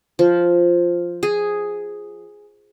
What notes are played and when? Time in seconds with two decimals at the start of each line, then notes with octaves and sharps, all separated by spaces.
0.19 F3
1.23 G#4